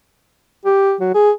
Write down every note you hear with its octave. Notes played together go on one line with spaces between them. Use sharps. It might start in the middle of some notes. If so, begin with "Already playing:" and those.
G4
F#3
G#4